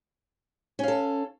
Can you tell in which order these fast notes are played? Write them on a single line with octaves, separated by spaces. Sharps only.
C#4 F5 A4